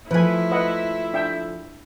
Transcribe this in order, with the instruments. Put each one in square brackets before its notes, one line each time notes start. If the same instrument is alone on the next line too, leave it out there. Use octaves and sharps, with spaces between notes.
[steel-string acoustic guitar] F3 A3 [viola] E4 [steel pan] B4 G#5
[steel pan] B4 D#5 F#5
D4 E5 G5